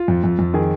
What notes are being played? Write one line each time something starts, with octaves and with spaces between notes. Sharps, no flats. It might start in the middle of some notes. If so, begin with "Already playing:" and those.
Already playing: F4
F2
F2
F2
D#3 G#4